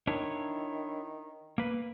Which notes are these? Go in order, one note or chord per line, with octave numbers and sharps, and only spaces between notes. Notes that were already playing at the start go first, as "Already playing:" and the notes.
D#3 D4 E4 C#5
A#3 B4